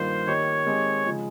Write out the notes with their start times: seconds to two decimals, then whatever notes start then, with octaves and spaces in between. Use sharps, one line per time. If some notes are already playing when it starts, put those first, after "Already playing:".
Already playing: G2 D#3 A#3 F4 C5
0.26 D#3 A#3 D#4 G4 C#5
0.66 D#3 G#3 C4 D#4 G4
1.05 C#3 F3 G#3